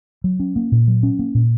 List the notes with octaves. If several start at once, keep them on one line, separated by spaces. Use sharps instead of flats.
F#3
C#4
A#3
A#2
F#3
C#4
A#3
A#2